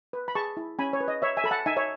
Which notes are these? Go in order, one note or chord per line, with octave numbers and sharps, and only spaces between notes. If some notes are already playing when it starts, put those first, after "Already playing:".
B4
B5
G#4 A5 C#6
E4
C#4 G#5 B5
C#5
B4
D#5
C#5 E5
E5 G#5
A4 B5
F#5 A5
D#4 E5 G#5
C#5 E5